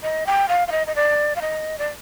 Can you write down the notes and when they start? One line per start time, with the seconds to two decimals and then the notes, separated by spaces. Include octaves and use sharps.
0.03 D#5
0.26 G5
0.48 F5
0.68 F5
0.72 D#5
0.87 D#5
0.95 D5
1.36 F5
1.41 D#5
1.79 D5